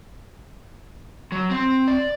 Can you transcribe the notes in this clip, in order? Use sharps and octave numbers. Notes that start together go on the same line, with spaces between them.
F#3
C4
D5